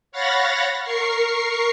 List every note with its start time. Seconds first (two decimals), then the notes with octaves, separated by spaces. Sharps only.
0.12 C#5 F5 F#5 B5 A6 A#6
0.84 A#4 C#6 C7